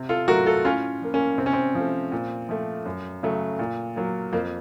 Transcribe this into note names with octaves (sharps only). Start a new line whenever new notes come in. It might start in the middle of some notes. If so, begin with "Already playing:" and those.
Already playing: C3
F4 A4
F#3 A3 F#4 A#4
F4 A4
A2 C#4 F4
F3 A#3
A#3 C#4
C3 C4
C#4
C4
F3 A3
A#2
F3 A3
F#2
C#3 F#3 A3
A#2
F#3 A#3
F2 A#3